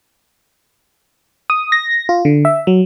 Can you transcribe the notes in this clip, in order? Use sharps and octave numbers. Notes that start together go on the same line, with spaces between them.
D#6
A#6
F4
D3
E5
F#3